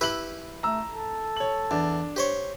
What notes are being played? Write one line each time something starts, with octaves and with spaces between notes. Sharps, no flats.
E4 G4 B4 E6 F#7
A3 A#5 E6
A4
C#5 F#7
E2 D4
G4 C5 C#5